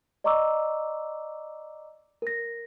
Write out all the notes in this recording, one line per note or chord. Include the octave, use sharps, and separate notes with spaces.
D5 D#5 A#5 C#6 D6 E6
A#4 A#6